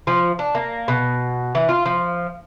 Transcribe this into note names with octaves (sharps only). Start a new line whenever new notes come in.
F3
D4
A#3
B2
E3
F4
F3